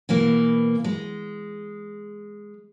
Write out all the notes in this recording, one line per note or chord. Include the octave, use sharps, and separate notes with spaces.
B2 E3 A#3
G#3